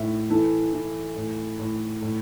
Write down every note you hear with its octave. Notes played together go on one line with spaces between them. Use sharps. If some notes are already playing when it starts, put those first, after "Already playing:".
Already playing: A2 E5
E3 A4
E3
A2
A2
A2